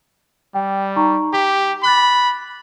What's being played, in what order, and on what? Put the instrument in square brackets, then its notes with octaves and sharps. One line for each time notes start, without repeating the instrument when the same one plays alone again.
[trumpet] G3 [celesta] G5
[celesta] D#4 A#5 C#6
[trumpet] G4 [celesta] B6
[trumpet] B5 [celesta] D6 F#6 A6